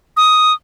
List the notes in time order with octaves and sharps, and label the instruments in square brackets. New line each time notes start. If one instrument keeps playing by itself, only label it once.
[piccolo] D#6